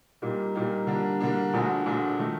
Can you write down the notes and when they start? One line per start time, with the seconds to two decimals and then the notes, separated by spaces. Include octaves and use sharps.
0.22 A#2 G3 A#3 D#4 G4
0.55 A#2 G3 A#3 D#4 G4
0.87 D3 G3 A#3 D4
1.20 D3 G3 A#3 D4
1.53 A#1 A#2 A3 D4 F#4
1.86 A#1 A#2 A3 D4 F#4
2.19 D#3 A3 D#4